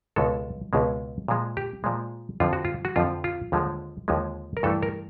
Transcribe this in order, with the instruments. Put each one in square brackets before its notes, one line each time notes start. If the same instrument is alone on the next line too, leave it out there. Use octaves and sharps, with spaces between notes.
[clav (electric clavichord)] C#2 B2 G#3 A4
C#2 B2 G#3
A#2 F3 G#3
G4
A#2 F3 G#3
F2 D3 F3 F4
F#4
F4
F#4
F2 D3 F3 F4
F4
D#2 D3 F3 G#3
D#2 D3 F3 G#3
A#4
G2 E3 A3 A4
A#4